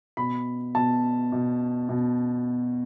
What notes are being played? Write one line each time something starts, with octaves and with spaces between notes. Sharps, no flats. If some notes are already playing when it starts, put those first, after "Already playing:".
B2 B5
B2 A5
B2
B2